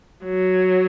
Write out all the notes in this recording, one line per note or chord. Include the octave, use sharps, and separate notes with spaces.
F#3